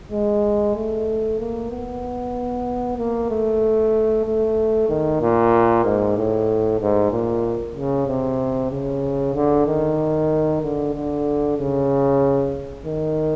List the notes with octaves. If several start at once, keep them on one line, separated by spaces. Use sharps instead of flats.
G#3
A3
A#3
B3
A#3
A3
A3
D#3
A#2
G#2
A2
G#2
A#2
C#3
C3
C#3
D3
D#3
D3
D3
C#3
D#3